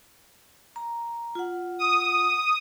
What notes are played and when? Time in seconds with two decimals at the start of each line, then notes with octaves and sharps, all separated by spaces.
0.76 A#5
1.35 F4 F#5
1.79 D#6